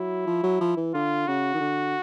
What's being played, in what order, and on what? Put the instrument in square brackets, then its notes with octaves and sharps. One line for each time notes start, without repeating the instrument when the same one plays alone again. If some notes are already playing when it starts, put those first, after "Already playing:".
Already playing: [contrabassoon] F#3 [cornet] E4
[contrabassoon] F3
F#3
F3
E3
[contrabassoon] D3 [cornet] F4
[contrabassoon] C#3 [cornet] F#4
[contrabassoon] D#3
D3